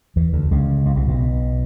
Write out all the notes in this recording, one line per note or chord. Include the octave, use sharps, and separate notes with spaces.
E2 E3
D2 D3
C#2 C#3
C#2 C#3
C2 C3
B1 B2